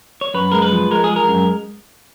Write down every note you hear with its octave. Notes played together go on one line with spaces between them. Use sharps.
C#5
F#2 B4
G#3 A#4
B4
F3
G#3 A#4
G#4
G#3
A#4
F#2